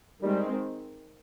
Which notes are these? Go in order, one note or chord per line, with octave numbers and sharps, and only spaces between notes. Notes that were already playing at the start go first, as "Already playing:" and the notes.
D#3 G3 G#3 C4